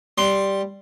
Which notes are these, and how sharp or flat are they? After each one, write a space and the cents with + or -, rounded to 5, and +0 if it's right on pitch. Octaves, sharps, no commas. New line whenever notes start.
G3 +0 C6 +0